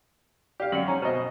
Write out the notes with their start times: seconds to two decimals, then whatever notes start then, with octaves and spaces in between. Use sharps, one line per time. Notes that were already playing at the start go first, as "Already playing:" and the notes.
0.60 G4 D5 F5
0.72 F#2 C#7 F#7
0.88 C#4 G#5 A#5
1.02 B2 C5 D#5